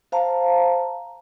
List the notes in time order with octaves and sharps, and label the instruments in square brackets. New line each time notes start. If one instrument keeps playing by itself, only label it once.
[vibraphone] C5 F5 A5 A#5